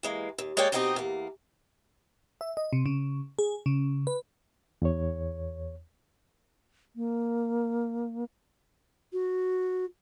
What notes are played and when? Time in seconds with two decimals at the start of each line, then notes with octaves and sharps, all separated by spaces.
0.03 E3 G#3 A#3
0.38 D#2
0.57 G#3 A#3 C#5 D5 G5 G#5
0.72 B2 C4 D#4 E4 G4 D#5
0.96 E2 A#3
2.41 E5
2.57 D#5
2.73 C3
2.86 C#3
3.39 G#4
3.66 C#3
4.07 B4
4.82 E2 C#5
6.96 A#3
9.12 F#4